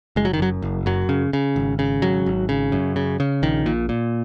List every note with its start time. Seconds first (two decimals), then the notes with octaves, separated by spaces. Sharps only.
0.16 F#1 G#3
0.25 F#3
0.34 D#3
0.39 F#2 F#3
0.62 F#1
0.86 F#2 F#3
1.09 C#3
1.33 C#3
1.56 G#1
1.79 C#3
2.02 G#1 F#3
2.26 G#1
2.49 C#3
2.72 F#2
2.96 C#3
3.20 C#3
3.42 A#1 D#3
3.66 A#2
3.89 A#2